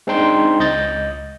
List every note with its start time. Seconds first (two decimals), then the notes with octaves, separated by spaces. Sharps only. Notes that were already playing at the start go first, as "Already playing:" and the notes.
0.07 G#3 C4 D4 D#4 G5 C6
0.60 C#2 D#5 G6 A6